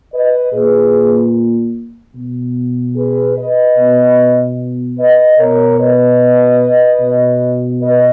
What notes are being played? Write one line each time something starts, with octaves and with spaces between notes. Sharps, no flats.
B4 D#5
A#2 G#4 B4
B2
G#4 B4
B4 D#5
B2
B4 D#5
B2 A#4 C#5
B4 D#5
B2
B4 D#5